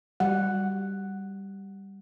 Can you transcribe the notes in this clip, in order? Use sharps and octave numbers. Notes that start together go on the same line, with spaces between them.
G3 F#5